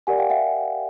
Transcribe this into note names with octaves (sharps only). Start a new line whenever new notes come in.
G4 A#4 D5 F#5 G#5
F5 G5
E5 F#5